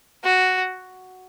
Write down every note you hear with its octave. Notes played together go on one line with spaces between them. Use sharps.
F#4